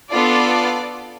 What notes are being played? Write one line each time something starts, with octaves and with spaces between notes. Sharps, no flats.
B3 D4 F4 A4 D5